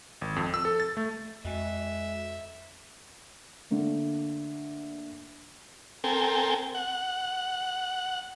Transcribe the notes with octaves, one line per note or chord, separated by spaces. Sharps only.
G#1
F2
E6
A4
A6
A3
F2 G#3 F#4 D#5 E5
D3 A3 A#3 D4
C4 A4 A#4 G5 G#5
F#5